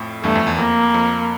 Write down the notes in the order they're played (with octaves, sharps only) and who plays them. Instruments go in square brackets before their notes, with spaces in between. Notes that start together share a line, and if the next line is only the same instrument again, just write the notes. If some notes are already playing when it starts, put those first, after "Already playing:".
Already playing: [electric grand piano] F2 A2
[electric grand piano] E2 G2 [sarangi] A3
[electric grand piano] F2
E2
[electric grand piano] F2 [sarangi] A#3
[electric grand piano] F2